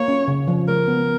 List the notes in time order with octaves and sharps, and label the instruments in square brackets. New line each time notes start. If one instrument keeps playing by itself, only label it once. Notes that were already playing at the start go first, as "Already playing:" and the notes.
Already playing: [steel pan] A#3 [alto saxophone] C#5
[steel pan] C#4
C#3
F3
[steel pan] G#3 [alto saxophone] A#4
[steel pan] B3